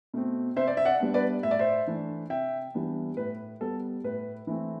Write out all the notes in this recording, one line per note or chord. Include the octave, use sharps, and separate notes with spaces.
B2 A3 C4
C3 C5 E5
D5
E5
D5 F#5
G3 B3 D4
B4 D5
A2 E5
D5
C5 E5
E3 A3 D4
C3 E5 G5
E3 G3 B3 D4
A2 B4
G3 B3 A4
A2 B4
E3 A3 C4